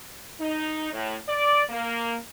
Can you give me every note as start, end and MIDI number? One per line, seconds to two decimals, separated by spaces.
0.40 0.88 63
0.92 1.15 45
1.28 1.62 74
1.70 2.17 58